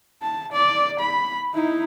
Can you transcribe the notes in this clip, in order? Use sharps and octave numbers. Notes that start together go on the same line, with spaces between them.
A5
D5
B5
D#4 E4